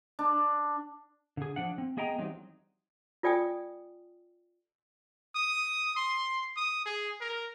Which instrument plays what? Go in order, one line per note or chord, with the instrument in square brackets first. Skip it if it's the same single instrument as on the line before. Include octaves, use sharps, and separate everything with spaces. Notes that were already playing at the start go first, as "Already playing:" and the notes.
[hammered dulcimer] D4
[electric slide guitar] D3 G#4
F3 D4 F#5
C4
B3 G#4 D#5 G5 A#5
E3 F#3 G3 C4 D#4
[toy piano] F4 A4 D5 G5 G#5 D#6
[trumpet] D#6
C6
D#6
G#4
A#4